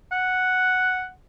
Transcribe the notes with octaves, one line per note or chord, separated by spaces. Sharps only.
F#5